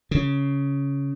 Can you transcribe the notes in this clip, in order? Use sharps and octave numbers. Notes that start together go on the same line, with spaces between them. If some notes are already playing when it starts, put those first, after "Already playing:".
C#3